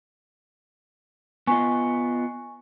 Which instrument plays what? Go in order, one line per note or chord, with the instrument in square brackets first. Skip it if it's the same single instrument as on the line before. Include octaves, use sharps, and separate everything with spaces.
[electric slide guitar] B3 F4 D#5 [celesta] G#5 C#6